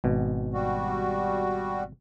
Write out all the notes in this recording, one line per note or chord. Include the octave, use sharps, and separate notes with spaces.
G#1 B2
G3 F#4